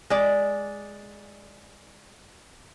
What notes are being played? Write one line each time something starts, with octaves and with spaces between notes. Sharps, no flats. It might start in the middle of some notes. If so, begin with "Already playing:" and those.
G#3 D5